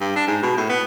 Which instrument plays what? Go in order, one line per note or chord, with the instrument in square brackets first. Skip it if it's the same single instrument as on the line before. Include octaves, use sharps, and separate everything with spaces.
[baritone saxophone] G2
D4
G#2
B2
A2
B3